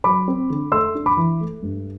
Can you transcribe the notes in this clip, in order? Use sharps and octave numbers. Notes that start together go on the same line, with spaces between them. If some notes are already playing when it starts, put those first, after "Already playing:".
F#3 B5 D6
C4
D3
A3 C6 E6
D4
B5 D6
E3
A3
G2